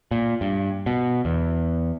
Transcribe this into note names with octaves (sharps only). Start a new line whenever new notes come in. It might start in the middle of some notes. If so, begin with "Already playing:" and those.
A#2
G2
B2
E2